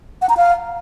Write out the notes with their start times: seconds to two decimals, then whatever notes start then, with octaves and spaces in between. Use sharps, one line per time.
0.22 F#5
0.29 A#5
0.37 F5